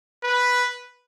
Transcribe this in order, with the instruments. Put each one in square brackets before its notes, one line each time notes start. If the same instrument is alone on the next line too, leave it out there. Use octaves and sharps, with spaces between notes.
[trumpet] B4